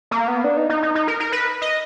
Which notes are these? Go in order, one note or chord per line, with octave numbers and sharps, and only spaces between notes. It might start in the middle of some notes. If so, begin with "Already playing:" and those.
A#3
B3
D4
D#4
D#4
D#4
D#4
A#4
A#4
B4
D#5